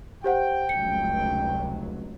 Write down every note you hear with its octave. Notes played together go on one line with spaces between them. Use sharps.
G4 C5 F#5 G5
F1 C#2 F#3 C#7